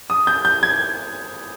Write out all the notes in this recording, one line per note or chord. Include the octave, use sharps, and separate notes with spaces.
D#6
G6
G6
G#6